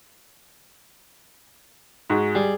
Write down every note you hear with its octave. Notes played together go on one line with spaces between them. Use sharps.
G#2 F#4 G#4
G3 G#4